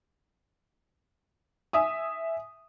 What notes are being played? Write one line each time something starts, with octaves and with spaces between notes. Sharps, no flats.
E5 G#5 D#6